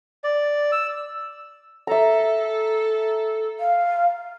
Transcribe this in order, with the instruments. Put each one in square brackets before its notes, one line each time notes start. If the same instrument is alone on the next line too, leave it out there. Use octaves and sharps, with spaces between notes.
[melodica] D5
E6
[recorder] A4 [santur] E5 A#5
[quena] F5